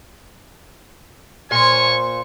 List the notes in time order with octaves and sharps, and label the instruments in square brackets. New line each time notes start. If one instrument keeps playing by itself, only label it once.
[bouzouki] A#2 C5 [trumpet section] C#5 G#5 C#6